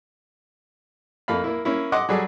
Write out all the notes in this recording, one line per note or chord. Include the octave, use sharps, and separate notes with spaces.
F2 A3 A#3 F5 B5
A#3 E4
A#3 C#4 E4
D#5 F#5 C6 D6
F#3 G3 G#4 A4 D5